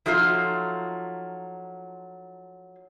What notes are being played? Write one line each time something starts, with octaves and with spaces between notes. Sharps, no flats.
F3 F#3 A3 D#4 F4